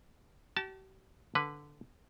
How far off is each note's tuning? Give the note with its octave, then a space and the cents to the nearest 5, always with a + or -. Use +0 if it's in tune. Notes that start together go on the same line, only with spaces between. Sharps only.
G4 -45 A5 +0
D3 +0 B4 +0